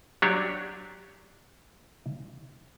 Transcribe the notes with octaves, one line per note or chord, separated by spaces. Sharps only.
F#3 D4 G4 C#5